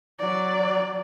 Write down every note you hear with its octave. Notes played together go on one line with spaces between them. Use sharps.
F#3 D5